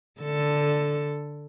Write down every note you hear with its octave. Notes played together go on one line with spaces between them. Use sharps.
D3 A4